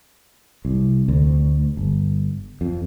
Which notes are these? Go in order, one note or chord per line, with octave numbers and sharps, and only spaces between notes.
C2
D2
G1
F2